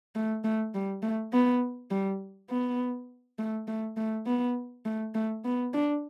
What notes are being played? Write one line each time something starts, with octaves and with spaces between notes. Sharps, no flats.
A3
A3
G3
A3
B3
G3
B3
A3
A3
A3
B3
A3
A3
B3
D4